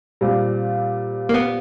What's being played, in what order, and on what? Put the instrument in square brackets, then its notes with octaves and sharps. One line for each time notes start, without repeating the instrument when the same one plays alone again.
[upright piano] A#2 G3 C4 F4
[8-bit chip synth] A#3
B3